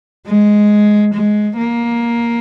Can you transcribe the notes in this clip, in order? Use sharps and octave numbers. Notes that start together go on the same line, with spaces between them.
G#3
G#3
A#3